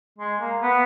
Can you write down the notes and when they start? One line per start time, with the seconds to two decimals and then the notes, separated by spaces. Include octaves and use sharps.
0.18 G#3
0.40 A#3
0.62 B3